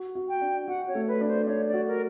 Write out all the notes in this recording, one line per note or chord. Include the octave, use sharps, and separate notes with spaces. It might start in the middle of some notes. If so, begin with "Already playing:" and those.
Already playing: F#4
F#4
G5
D4
F#4 F#5
C#5
A3
B4
D4
C5
D4 C#5
D5
F#4
A#4